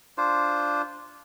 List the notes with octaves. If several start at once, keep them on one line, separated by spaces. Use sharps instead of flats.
D4 F4 C5